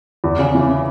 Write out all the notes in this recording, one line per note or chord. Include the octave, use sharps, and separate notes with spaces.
E2
C#3
E3